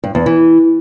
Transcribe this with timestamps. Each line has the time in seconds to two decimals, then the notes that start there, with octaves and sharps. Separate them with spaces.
0.04 G2
0.15 E2
0.26 E3